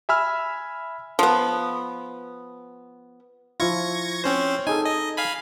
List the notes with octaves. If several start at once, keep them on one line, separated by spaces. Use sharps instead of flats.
E5 G#5 B5 E6 F6
F3 B3
F3 E4 F4 C#6 G#6 A#6
C4 C#4 C5
D#4 G#4 A4 G#5
D#5
F5 G#5 B5